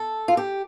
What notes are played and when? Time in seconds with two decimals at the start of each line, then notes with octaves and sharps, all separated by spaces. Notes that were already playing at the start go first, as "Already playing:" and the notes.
Already playing: A4
0.28 F4
0.37 G4